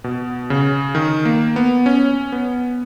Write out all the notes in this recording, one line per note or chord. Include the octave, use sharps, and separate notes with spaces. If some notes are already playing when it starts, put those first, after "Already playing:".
B2
C#3
D#3
A#3
B3
C#4
B3